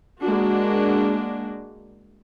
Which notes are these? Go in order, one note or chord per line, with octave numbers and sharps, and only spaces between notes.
G#3 A#3 D4 F#4